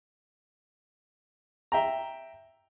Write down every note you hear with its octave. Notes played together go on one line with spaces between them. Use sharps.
E5 G5 A#5